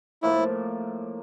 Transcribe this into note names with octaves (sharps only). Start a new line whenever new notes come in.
A2 F3 A#3 E4